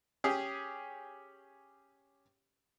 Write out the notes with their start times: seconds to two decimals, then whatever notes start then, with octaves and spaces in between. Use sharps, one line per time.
0.24 C#4 G4 G#4